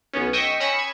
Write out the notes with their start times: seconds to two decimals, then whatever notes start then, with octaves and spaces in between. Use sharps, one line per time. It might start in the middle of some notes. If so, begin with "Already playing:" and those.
0.14 B1 B3 C#4
0.33 D#5 G5 C#6 D#6 E6 B6
0.60 C#4 B5 D#6 A#6 C#7 E7
0.79 G#6